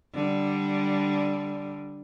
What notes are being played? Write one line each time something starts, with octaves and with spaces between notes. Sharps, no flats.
D3 G3